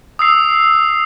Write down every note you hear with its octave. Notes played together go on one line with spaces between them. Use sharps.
D#6 E6 C7